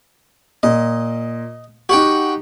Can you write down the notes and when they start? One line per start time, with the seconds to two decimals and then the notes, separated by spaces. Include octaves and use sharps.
0.63 A#2 D#5
1.89 D#4 F#4 G4 F#5 G5